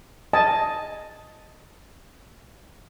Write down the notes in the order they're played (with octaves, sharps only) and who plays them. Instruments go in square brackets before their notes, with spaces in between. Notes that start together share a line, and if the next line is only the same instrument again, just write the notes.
[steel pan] D#5 G#5 A5